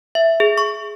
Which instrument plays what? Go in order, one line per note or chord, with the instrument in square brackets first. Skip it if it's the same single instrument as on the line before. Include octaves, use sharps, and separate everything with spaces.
[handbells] E5
G#4
C#6